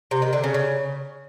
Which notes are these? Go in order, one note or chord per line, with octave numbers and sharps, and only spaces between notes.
C3
D#3
D3
C#3
C#3